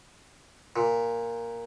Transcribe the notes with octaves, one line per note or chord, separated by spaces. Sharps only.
A#2